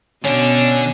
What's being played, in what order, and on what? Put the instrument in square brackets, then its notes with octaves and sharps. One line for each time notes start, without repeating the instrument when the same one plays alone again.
[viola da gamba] B2 [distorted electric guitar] D3 D4 [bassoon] C#4